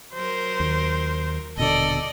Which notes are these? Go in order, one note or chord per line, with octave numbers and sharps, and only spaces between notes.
F#3 A#4 C5
D#2
D#1 B2 D3 A4 D5 D#5